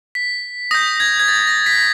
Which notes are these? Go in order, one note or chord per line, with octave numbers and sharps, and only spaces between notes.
B6
D#6 G6 A#6
G#6
G#6
A6
A#6
B6